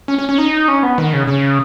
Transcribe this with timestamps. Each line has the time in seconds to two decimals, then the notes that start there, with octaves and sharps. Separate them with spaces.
0.08 C#4
0.19 C#4
0.29 C#4
0.38 D#4
0.68 C#4
0.83 B3
0.98 D#3
1.13 C#3
1.27 C#3